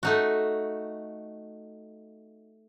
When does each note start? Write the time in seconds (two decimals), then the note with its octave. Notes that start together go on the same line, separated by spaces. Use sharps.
0.03 A3 D#4 F#4